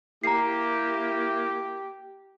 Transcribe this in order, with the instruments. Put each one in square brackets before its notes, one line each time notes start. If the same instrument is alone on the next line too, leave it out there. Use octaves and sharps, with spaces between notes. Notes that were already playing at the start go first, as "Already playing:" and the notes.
[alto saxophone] A#3 [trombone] E4 [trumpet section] G4 [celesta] A#5 C7